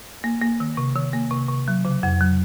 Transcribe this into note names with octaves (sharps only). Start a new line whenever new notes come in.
A#3
A#3
D#3
C3
D#3
A#3
C3
C3
F#3
C#3
F2
F#3